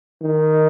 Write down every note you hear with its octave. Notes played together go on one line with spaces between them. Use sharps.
D#3